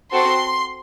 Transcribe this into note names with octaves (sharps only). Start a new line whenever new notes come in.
C4 F#4 A4 C6